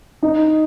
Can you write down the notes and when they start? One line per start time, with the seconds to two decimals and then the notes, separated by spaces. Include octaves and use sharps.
0.23 D#4